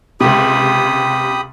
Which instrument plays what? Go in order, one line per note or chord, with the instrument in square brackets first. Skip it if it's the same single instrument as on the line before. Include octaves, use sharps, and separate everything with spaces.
[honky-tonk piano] C#2 C3 [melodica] G4 B5 D#6